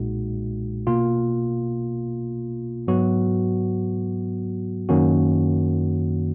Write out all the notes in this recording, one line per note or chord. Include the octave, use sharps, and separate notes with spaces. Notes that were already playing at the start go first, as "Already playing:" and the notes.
Already playing: B1 A#2 G#3 D#4 F#4
B2 A#3 F4
G#2 F#3 B3 F#4
F#2 D#3 A#3 C#4 F#4